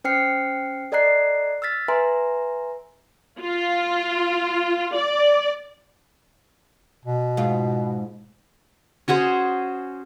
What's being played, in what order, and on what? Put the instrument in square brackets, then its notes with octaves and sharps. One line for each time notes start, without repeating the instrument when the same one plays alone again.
[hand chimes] C#4 C5 G5 F6 C7 C#7
A4 D5 D#5 A#5 F#6 C7
E6 F6 A6 B6
B4 E5 G#5 A#5 C6
[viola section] F4
D5
[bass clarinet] B2
[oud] G#2 F4
[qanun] C#4 F#4 G#4 C5